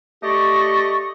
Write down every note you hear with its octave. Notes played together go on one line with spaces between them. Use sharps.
A3 G4 D5 D#5 C#6